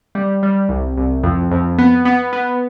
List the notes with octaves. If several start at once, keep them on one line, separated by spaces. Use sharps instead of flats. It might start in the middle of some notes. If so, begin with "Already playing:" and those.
G3
G3
C2
C2
F2
F2
B3
B3
B3